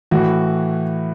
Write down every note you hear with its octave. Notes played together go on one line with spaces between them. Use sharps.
A2 E3 F#4